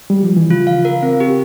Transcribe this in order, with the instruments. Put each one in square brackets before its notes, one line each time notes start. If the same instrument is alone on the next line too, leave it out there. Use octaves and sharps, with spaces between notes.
[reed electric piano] G3
F3
E3
[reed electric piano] C#3 [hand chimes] F4
[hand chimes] F5
A#4
C4
G4